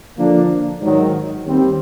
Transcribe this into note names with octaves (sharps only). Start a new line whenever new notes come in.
D3 F3 A#3 D4
G#2 D#3 F#3
D#2 D#3 G3 C4